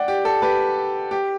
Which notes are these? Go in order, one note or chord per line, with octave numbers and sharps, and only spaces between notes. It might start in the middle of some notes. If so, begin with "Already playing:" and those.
Already playing: D5 F#5 G5
G4
A4
G4 B4
G4